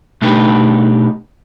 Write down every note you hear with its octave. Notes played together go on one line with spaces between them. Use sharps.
B2 A3 D4 D#4 G4 B4